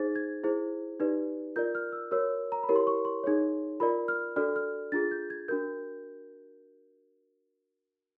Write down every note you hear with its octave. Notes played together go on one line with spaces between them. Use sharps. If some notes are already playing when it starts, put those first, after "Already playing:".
Already playing: D#4 G#4 C5 A6
G#6
E4 G#4 C5
D#4 G4 B4 D5
F4 A#4 D5 G6
F6
E6
F#4 A#4 C#5 E6
A#5
B5
E4 G4 A#4 C#5
C6
C#6
C6
D#4 G#4 C#5
F4 A#4 D5 B5
F6
D4 F#4 A4 D5 F6
F6
D4 F4 G#4 A6
G6
G#6
D4 F#4 A#4 G6